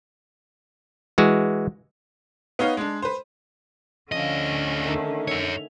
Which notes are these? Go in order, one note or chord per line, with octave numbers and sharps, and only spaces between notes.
E3 G#3 F#4
B3 D#4 C#5 F5
G#3 D4
B4 C5
D2 D3 F3 C#4 D#5
D5
D#3 A3
A#4 C#5 E5 G#5